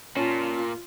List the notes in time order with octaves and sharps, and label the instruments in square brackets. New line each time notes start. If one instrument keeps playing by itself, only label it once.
[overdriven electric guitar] A#2 [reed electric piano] C#4 A5 [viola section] F4